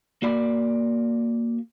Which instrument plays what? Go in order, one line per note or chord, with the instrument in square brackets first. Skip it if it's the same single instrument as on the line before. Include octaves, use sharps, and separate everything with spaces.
[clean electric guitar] A#3 F#4 D5 B5